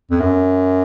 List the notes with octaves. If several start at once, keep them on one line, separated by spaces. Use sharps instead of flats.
F2
F#2